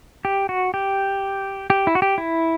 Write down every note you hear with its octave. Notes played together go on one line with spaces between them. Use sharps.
G4
F#4
G4
G4
E4
F#4
G4
E4